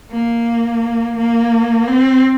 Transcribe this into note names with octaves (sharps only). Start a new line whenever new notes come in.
A#3
A#3
C4